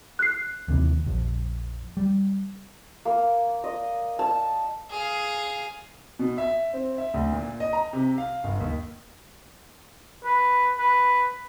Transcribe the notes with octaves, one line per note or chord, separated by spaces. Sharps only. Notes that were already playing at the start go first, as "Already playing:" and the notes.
F#6 C7
D#2 C3 E3
A#1 F2
G3
A#3
D#5
A5
G#4 F5
B2
E5
C4
E5
D2
A#2
D#5
A#5
C3
F5
G1
D#2
B4
B4